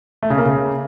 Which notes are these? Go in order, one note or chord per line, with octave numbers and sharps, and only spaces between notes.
A3
C#3
A#3
C#3